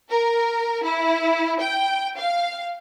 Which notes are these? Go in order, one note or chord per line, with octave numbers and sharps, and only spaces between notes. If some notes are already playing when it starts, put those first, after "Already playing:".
A#4
E4
G5
F5